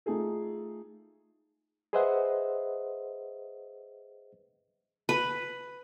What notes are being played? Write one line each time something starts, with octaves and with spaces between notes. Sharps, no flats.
A3 D#4 F4 G#4 A4
G#4 B4 C5 D#5 E5 F#5
B4